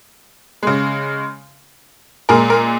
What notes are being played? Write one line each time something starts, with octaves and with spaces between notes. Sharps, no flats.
C#3 G#3
A#2 G#3 A#4
A#4